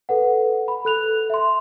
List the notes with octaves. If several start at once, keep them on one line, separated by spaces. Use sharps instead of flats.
A4 B4 F#5
B5
A4 F#6 F7
E5 C6